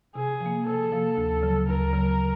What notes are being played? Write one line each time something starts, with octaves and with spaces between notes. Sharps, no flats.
C3 G#4
F3
A#3
C3 A4
F3 A#3
D2
C#3 F#3
D2 A#4
C#3 F#3